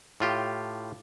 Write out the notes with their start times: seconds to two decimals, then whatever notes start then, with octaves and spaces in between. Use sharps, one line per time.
0.20 A2 F4 G4